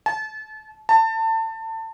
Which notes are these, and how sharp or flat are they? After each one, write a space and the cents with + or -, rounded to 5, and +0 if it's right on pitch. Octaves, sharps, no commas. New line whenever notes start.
A5 -35
A5 +25